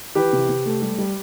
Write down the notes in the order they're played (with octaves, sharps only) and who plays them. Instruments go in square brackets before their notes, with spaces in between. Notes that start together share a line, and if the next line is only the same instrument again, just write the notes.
[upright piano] E3 G4 B4
C3
C3
A3
G3
G3